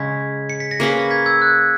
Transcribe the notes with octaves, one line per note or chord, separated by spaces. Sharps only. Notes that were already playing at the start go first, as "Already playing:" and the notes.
Already playing: C#3 G#3 C#4 G#6 B6
C#7
B6
A#6 C#7
A#3 C#4 G#4 B4
A#6
G#6 B6
E6 G#6
F#6